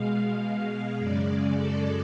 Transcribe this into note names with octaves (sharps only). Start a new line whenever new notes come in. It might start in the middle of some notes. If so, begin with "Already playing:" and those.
Already playing: B2 G#3 F5
F5
F#2 C#3 G#3 D5
A4